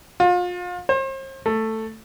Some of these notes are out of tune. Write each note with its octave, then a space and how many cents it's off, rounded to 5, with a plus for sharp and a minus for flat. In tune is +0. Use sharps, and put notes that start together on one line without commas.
F4 +35
C5 +40
A3 +10